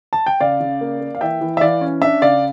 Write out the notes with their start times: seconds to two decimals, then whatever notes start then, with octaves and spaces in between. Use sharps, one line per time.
0.13 A5
0.26 G5
0.40 C#3 D5 F5
0.60 C#3
0.81 A#3
1.01 A#3
1.15 F5
1.21 E3 E5 G5
1.41 E3
1.57 E5
1.61 E3 D5 F5
1.81 C#4
2.02 D4 E5
2.22 C#3 D5 F5